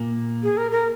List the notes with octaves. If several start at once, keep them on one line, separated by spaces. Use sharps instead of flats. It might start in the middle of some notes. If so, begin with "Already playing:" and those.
Already playing: A#2 A#3
G#4
A#4
A#4